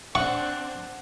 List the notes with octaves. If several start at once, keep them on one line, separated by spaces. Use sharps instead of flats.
C4 D4 F#5 C#6